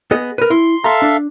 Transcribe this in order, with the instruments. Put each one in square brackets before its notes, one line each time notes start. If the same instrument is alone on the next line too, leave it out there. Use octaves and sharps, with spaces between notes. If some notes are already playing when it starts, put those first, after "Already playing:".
[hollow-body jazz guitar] B3 G#4 D#5
A#4 B4
[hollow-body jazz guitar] E4 [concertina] C6
[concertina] A4 E5 F5 [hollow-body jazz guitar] A#5 C6
[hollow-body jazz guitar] D4